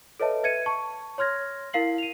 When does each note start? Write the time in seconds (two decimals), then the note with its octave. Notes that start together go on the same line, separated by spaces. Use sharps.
0.20 A4 B4 C#5 D#5 E5 A5
0.43 B4 E5 G#6 C#7 D#7
0.66 A5 C#6
1.18 C#5 C6 F6 G#6 A#6
1.73 E4 A#4 F5 C7 F#7
1.98 D#7 F7